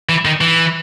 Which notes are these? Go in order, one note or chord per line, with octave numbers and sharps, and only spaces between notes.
E3
D#3
E3